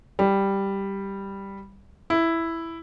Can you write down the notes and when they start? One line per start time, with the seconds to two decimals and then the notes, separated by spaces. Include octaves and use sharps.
0.19 G3
2.10 E4